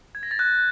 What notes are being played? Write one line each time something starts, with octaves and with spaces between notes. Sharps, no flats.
G#6
A#6
A6
F#6